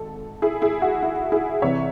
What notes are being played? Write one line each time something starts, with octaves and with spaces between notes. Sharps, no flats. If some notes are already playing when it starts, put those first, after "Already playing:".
Already playing: G#1 G#2 A4
E4 G#4
E4 G#4
F#4
E4
E4 G#4
C2 C3 E3 C#5 E5